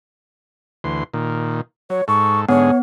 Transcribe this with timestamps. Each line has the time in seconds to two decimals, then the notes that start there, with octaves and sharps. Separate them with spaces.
0.84 D2 E3 C6
1.14 A#2 D#3
1.90 F#3 C#5
2.08 G#2 A4 C#6
2.49 G#2 D3 B3 G#4 C#5